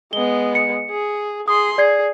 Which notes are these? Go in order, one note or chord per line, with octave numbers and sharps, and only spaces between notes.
G#3 B3 G7
C#7
G#4
G#4 C6 D#6
G#4 D5 G#6 C7